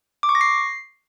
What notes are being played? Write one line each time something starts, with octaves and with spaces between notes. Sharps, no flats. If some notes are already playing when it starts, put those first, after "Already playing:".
D6
C#6
A#6
C7